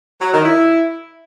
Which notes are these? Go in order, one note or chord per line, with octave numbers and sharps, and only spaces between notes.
F#3
D#3
E4